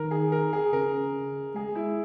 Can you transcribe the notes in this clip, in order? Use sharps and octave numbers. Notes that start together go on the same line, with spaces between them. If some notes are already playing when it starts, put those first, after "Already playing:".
Already playing: D#3 A#4
G#4
A#4
G#4
C#3 A#4
G#3 G#4
E4